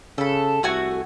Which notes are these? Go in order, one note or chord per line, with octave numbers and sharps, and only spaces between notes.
C#3 A4 B5
C2 A3 F#4 G#5